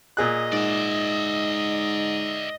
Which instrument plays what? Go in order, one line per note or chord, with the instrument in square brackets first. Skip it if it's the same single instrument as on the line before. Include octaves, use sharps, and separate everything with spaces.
[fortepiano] A#2 G#4 F#6 [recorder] D#5
[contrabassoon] G#2 [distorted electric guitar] D5 E5